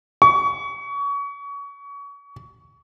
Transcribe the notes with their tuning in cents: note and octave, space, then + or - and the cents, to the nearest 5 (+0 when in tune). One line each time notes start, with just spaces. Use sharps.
C#6 +30